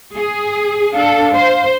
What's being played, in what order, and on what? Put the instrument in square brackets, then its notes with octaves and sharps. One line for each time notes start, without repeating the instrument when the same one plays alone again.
[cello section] G#4
[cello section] D4 A4 [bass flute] F5
[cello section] C5